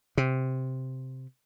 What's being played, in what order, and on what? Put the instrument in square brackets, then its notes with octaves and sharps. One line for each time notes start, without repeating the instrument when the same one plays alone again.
[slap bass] C3